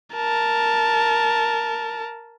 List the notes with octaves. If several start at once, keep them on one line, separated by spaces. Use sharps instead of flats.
A#4 A5